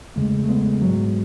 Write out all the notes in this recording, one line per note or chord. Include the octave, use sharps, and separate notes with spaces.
E2 C#3 G#3 A3
A3
G#3 B3
G#2 F#3